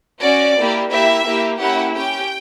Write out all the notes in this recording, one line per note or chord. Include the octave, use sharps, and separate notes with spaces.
C#4 F#4 D5
A#3 E4 G4
A#3 E4 G4 E5
A#3 E4 G4
A#3 C#4 E4 G4 F#5
C#4 G4 G5